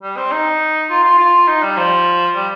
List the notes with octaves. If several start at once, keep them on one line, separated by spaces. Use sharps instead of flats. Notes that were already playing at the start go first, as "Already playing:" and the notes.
G3
C4
D#4
F4
F4
F4
D#4
G3
F3
G3